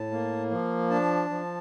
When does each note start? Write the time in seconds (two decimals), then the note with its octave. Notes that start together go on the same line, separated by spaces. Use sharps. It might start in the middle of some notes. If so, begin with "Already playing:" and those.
Already playing: A2 A5
0.11 A#3
0.51 F3
0.90 D4 A5
1.30 F3